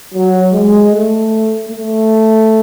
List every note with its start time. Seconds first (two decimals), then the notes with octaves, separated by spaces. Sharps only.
0.14 F#3
0.52 G#3
0.91 A3
1.69 A3